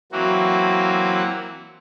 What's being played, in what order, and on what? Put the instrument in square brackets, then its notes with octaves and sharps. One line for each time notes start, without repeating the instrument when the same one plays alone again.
[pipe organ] E3 F#3 A#3 C4 F#4